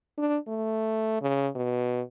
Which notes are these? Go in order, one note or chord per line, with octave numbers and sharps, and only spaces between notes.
D4
A3
C#3
B2